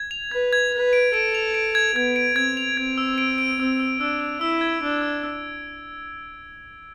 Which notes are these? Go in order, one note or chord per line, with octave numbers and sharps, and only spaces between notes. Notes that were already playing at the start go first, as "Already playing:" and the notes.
Already playing: G#6
F7
B4 G#6
G#6
B4 G#6
D7
A4 D7
F7
D7
G#6
B3 G#6
D7
C4 G#6
F7
C4 G#6
E6
D7
D7
C4 E6
E6
D4 E6
E6
E4 E6
G#6
D4 D7
E6
E6